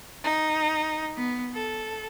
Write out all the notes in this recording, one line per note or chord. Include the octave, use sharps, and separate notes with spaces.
D#4
B3
A4